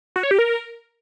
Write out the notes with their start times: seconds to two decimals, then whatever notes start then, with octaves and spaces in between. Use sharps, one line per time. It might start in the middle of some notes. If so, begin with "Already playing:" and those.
0.16 F#4
0.23 C#5
0.31 G4
0.39 A#4